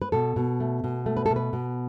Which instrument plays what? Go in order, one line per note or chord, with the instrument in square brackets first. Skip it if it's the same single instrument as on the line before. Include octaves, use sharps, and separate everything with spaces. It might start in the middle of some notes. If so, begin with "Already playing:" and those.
[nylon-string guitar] B4
B2 A4
B2
A3
B2
A3
B4
B2 A4
B4
B2